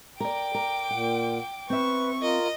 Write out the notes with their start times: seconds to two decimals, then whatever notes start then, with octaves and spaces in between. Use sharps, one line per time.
0.20 A#4 D5 G5 D6
0.55 A#4
0.91 A#2 F#5
1.70 C4 B4 E5 C#6
2.22 F4 A#4 D#5